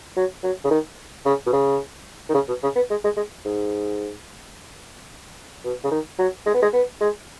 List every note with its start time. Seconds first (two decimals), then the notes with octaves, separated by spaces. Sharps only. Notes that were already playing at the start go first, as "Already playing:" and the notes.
0.16 F#3
0.43 F#3
0.64 C#3
0.70 D#3
1.25 C#3
1.46 B2
1.53 C#3
2.29 D#3
2.34 C#3
2.48 B2
2.63 C#3
2.76 B3
2.90 G#3
3.04 G#3
3.17 G#3
3.45 G#2
5.64 B2
5.84 C#3
5.91 D#3
6.19 F#3
6.46 G#3
6.54 B3
6.62 G#3
6.73 B3
7.01 G#3